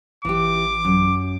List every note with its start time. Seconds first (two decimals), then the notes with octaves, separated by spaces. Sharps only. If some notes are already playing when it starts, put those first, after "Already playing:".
0.25 A1 E3 G4 D6
0.85 F#2